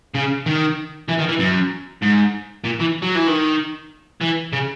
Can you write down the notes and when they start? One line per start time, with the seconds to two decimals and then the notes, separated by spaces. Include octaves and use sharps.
0.14 C#3
0.46 D#3
1.08 E3
1.19 D#3
1.29 E3
1.39 F#2
2.02 G#2
2.65 A#2
2.80 E3
3.02 F#3
3.15 E3
3.27 D#3
4.21 E3
4.53 C#3